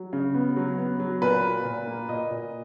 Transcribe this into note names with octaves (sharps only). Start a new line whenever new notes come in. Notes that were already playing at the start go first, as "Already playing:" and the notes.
Already playing: F#3
C#3
B3
F#3
B3
F#3
A#2 B4
A#2
A#2
A#3
A#2 D#5
A#2